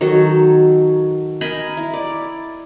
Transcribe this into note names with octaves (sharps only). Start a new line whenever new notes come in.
D#3 F#3 F#4 A4
A#4 D#5 G#5 B5
E4
D5